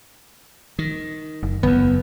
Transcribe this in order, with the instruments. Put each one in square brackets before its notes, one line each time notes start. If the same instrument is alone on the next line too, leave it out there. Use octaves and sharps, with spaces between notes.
[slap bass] D#3
[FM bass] F#1
[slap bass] F#1 E2 [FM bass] B3